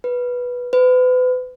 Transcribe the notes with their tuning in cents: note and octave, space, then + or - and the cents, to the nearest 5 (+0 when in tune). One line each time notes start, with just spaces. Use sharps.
B4 -10
B4 +35